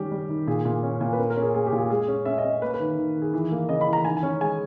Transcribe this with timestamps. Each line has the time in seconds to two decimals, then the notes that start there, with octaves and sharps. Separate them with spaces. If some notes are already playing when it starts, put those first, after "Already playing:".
Already playing: D#3 G3 C#4 G4
0.12 G3
0.29 D#3
0.47 A#2 G#4
0.65 A#2
0.83 C#4
1.01 A#2
1.13 B4
1.18 C#4 A#4
1.30 A#4
1.36 C#4
1.42 G#4
1.54 A#3 G#4
1.67 G4
1.72 A#2
1.78 G#4
1.90 G#3 G#4
2.08 C#4
2.25 C#4 E5
2.38 D#5
2.44 C#4
2.62 A#3 B4
2.74 B4
2.80 D#3
2.98 D#3
3.15 D#3
3.22 G#4
3.34 E3
3.52 A#3
3.69 C#3 D#5
3.81 B5
3.87 E3
3.93 A#5
4.05 D#3 G#5
4.17 G#5
4.23 C#4
4.41 G#3 G#5